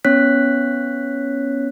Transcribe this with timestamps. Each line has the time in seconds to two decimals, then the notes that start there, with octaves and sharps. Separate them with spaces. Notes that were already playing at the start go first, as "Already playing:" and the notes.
0.05 B3 C#4 C#5 F#6 B6